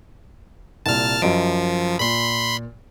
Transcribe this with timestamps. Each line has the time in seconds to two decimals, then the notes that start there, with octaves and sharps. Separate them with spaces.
0.86 C2 A#2 A5 F6
1.22 F#2 F3 D#5 D7
1.99 A#2 B5 C6